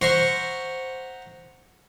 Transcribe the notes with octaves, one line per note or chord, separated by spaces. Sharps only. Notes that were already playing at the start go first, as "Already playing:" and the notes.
C5 E5 F#5 A#5 C6 C#6